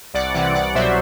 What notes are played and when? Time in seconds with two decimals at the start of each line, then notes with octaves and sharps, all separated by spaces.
0.14 C2 D5 F#5
0.34 C3 E3 D5 F#5
0.55 C2 D5 F#5
0.75 B2 F#3 C5 E5